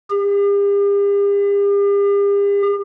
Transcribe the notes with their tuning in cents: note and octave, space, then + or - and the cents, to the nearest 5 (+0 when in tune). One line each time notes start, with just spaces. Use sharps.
G4 +45